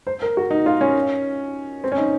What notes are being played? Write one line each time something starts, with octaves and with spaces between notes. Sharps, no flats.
C5
A#4
F#4
D#4
F4
C#4
C4
C#4
D#4